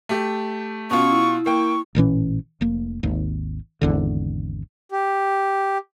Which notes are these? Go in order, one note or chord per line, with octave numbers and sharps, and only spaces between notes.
A3 G4
B2 C#4 F4 C#6
E4
A#3 G5 C#6
A1 A#2 E3 C#4
F1 A#3
G#1 D#2
G#1 E2 D3
G4